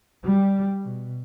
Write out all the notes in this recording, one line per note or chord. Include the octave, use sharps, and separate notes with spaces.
G3
B2